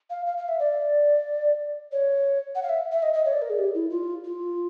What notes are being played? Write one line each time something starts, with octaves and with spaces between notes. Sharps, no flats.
F5
F5
F5
E5
D5
C#5
F#5
F5
E5
E5
D#5
D#5
C#5
D5
A#4
G#4
G4
E4
F4
F4